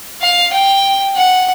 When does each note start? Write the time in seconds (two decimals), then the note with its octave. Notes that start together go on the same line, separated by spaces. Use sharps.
0.21 F5
0.52 G5
1.16 F#5